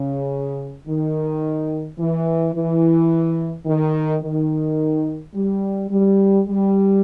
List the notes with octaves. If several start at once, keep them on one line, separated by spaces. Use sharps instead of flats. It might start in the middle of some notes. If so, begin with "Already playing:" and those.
Already playing: C#3
D#3
E3
E3
D#3
D#3
G3
G3
G3